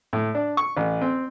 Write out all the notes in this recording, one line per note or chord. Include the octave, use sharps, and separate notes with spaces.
A2
D4
C#6
A1
C4